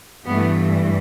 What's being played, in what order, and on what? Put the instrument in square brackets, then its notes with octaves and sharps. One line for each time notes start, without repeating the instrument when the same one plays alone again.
[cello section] G2 E3 A3 B3